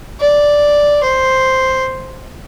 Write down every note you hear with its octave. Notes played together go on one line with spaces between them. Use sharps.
D5
C5